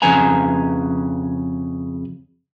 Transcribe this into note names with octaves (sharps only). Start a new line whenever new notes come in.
F2 C#3 B4 G#5 A#5